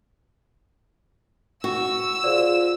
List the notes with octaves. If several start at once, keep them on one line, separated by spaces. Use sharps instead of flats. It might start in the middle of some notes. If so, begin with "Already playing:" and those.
F#4 E6
F4 G#4 C5 D5